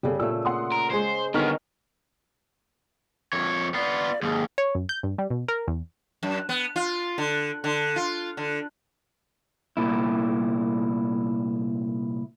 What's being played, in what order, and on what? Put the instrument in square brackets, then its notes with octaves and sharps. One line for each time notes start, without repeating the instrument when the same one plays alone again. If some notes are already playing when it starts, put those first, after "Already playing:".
[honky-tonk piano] G1 A4 [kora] C#3 G3
[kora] A#2 A3 [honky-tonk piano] E6
[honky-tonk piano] F#5 C6 D#6
[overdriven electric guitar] A#4
[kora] G#3 C#5 [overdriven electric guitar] C5
[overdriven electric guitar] D3 B3 [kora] D#3 C#4 A#4 [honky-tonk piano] D#4 C#6 F6
[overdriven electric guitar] F2 C#5
[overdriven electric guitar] B3 F4 [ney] D5
[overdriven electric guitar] D#2 G#2 [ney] G#4
[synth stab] C#5
F#2
G6
G2
G3
B2
A#4
E2
[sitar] F#2
B3
F4
D3
D3
F4
D3
[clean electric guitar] C2 A#2 E4